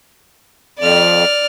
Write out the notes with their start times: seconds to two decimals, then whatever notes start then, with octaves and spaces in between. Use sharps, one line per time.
0.79 F2 D5 F6